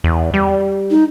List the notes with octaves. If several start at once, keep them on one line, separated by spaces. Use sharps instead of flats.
E2
G3
D#4